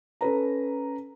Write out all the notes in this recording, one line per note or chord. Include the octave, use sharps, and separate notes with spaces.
C#4 A4 B4 A#5